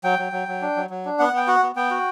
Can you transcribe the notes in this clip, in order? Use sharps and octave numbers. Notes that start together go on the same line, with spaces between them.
F#3 G5
F#3
F#3
F#3
D4
F#3
F#3
D4
B3 F#5
B3 G5
F#4 F#5
B3
B3 G5
F#4